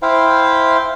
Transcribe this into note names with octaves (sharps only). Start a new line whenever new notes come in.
E4 C5 F5 G5